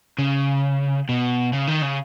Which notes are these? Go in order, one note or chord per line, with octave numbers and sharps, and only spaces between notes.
C#3
B2
C#3
D#3
C#3